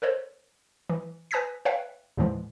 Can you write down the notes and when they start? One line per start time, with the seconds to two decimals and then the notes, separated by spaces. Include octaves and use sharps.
0.02 A4 A#4 C5 C#5
0.90 E3
1.31 B4 G#5 D#6 G6 A#6 B6
1.65 B4 C#5 E5 F5 G5
2.17 D#2 A2 D3 E3 F3 G#3